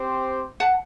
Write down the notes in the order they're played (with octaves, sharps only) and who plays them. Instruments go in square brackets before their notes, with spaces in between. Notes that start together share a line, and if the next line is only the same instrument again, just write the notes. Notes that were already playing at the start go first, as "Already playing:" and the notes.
Already playing: [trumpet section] C4 G4 C5
[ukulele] F#5 A5